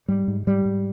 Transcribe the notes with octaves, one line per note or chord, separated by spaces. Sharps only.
G#2 G3
G#2
G#2 G3
G#2